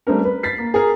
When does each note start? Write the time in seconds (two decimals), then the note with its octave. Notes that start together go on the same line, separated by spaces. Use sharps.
0.07 G3 A3 C4 D4 A#4
0.24 B4
0.43 A6 B6 C7
0.58 A#3
0.74 G#4 A#4